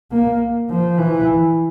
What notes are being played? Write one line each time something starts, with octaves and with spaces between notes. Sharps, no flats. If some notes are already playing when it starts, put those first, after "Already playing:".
A#3
F3
E3